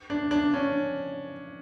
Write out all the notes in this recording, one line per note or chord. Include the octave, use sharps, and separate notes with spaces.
D4
D4
C#4